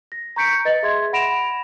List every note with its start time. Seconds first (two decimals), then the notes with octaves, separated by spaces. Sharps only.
0.12 A#6
0.36 A#5 C#6 G6 B6 C#7 D7
0.65 B4 D#5 A6
0.83 G#4 E5 C6 G#6
1.13 F#5 B5 A#6 D7 E7 F7